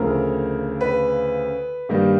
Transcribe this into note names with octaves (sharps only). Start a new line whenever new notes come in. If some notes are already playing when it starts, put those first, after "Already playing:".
Already playing: D2 C#3 F3 A#4
B4
G2 D#3 G3 A#3 D#4